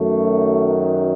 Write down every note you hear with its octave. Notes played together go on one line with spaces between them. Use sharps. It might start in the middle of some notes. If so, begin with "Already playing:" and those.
Already playing: F#2 D#3 F#3 A3